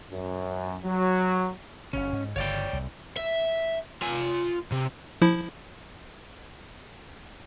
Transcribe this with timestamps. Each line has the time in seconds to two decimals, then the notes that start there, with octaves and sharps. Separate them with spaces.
0.11 F#2
0.84 F#3
1.93 F#1 F#2 C#3 C#4
2.13 G#2
2.36 G1 C#3 C#5 D5 G5
2.73 C2
3.17 E5
4.02 F4 G#5
4.72 C3
5.22 F3 E4